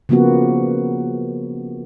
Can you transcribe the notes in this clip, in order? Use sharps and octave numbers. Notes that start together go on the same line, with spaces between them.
C#3 F3 A#3 B3 F#4